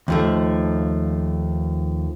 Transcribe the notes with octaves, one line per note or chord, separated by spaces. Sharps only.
D#2 F3 A3